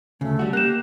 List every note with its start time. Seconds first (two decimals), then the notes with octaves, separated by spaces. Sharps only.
0.21 D2 C#3 A3
0.39 G3 F#4
0.53 A#3 G4 F#6 E7